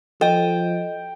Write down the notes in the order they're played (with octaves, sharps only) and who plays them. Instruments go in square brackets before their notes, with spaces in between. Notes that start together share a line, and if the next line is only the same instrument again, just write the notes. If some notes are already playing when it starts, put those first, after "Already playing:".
[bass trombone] F3 [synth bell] A4 D#5 [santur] G5